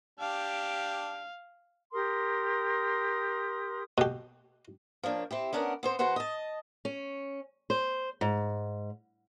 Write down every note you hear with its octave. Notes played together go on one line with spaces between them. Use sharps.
D4 G4 F5
G4 A#4 C6 D#6
B2 G4
F3 A#3 D4 C#5
C4 E4 G4
B3 C#4 D4 A#4 F#5
B3 C4 C5
E2 F#4 B4 C5 F#5
D#5 A5
C#4
C5
G#2